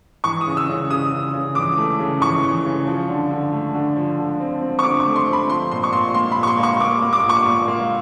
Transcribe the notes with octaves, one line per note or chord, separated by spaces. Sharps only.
E3 C#6
D#6
C#3
E6
C#3
C#3 D#6
C#3
C#3
E3 D6
A3
C#3
E3 C#6
E3
C#3
F3
D3
D3
A3
D3
F3
D3
C4
C4
C#6
D3 D6
C#6
A3
C6
C4
B5
F3 C6
A#2 C6
C#6
A#2 C6
A#3 C6
B5
A#2
C#6
C6
A#3 C#6
A#3 D6
A#3
D6
A#2
C#6
A#2
A#3